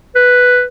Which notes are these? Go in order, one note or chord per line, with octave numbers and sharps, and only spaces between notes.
B4